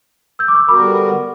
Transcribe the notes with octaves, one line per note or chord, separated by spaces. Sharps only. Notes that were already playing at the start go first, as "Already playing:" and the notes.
E6 G6
D6
C#6 E6
D3 G3 B3 F#4 A#4 B5 D6